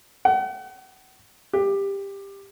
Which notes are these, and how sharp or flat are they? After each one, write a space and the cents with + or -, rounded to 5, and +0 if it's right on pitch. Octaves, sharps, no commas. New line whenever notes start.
F#5 +40
G4 +15